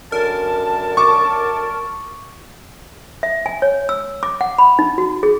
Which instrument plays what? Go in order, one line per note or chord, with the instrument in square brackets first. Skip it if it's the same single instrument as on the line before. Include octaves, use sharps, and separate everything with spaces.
[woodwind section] F#2 D3 A5 [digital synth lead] A#4
[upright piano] C#6 D6
[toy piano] E5
G#5
C#5
E6
D6
F#5
B5
D#4
F#4
G#4